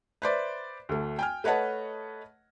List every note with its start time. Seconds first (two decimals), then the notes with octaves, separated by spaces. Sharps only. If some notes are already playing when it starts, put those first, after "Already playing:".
0.22 B4 C5 D5 E5
0.89 D2 A3
1.19 G5 G#5 F6
1.44 A3 B4 C#5 D#5 F#5 A5